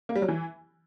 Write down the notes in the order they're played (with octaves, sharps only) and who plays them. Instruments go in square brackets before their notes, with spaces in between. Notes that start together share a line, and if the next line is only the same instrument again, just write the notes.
[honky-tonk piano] A#3
G3
F#3
E3